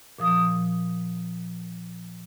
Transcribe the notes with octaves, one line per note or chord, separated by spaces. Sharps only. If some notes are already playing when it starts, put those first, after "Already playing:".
A#2 F3 D#6